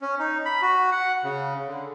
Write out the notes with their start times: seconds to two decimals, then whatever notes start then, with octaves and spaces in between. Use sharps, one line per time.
0.01 C#4
0.19 D#4
0.45 B5
0.62 F#4
0.92 F#5
1.24 C#3
1.68 D3